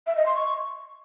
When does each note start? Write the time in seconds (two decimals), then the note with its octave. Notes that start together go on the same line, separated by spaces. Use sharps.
0.07 E5
0.16 D#5
0.26 C6
0.35 C#6